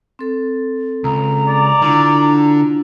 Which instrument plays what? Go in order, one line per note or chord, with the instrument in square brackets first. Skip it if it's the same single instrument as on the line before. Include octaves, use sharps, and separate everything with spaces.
[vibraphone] C4 A4
[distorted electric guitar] C#2 [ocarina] A#5
[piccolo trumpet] D5
[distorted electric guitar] D3 [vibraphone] D4 E4 F4